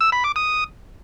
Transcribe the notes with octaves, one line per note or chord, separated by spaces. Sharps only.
E6
B5
D6
D#6